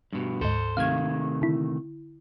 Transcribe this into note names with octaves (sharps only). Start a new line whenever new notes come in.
G2 B2
D2 G#2 A4 C5
C3 D#3 A3 F5 G#6
D3 E4